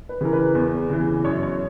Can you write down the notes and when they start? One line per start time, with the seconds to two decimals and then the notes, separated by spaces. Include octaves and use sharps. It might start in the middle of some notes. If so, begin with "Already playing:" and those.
0.09 B4
0.21 C#3 E3 A#4
0.33 B4
0.55 E2
0.90 C#3 E3
1.24 F#2 C#5
1.43 C#5